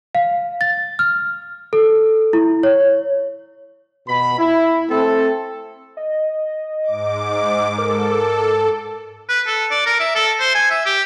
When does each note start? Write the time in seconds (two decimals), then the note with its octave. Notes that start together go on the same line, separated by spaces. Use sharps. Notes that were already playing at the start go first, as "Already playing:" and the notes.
0.15 F5
0.61 A6
0.99 F6
1.73 A4
2.33 E4
2.63 C#5
4.07 B2 B5
4.38 E4
4.89 A3 C4 A4
5.97 D#5
6.84 G#2 D6
7.78 A4 A#4
9.29 B4
9.47 A4
9.71 D5
9.86 A#4
10.00 E5
10.15 A4
10.40 C5
10.55 G#5
10.71 E5
10.86 G4